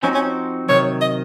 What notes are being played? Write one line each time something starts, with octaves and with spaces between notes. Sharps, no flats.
F3 C4 C#4 D#4 F#4
C#4
C3 D#3 F#3 C#5
D#5